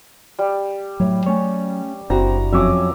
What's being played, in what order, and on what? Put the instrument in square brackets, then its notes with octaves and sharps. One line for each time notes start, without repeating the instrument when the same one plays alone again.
[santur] G3
[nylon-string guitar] A2 C#5 E5 [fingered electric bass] F#3
[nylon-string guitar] A3 C#4 [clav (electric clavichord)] C#5
[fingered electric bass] F#1 [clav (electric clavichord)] C4 [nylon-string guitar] D4 E4 F#4 [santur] A#5
[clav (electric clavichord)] F2 F#3 C#4 [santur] E5 D6 D#6